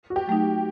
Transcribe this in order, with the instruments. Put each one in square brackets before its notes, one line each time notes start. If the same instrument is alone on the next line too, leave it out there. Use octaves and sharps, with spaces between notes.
[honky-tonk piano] F#4
G4
[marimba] F#3 A3 D#4